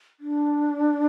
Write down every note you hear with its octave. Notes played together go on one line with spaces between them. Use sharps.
D4